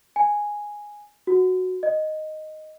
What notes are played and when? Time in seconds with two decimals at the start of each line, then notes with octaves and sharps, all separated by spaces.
0.16 G#5
1.27 F#4
1.83 D#5